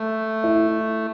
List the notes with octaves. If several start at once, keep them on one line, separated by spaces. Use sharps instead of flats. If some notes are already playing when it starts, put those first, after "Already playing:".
Already playing: A3
E4